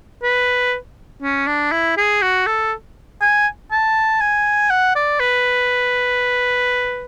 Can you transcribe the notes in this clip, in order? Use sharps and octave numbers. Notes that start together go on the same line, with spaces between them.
B4
C#4
D4
E4
G#4
F#4
A4
G#5
A5
G#5
F#5
D5
B4